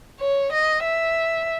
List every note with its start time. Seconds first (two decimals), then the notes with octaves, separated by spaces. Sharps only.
0.20 C#5
0.52 D#5
0.84 E5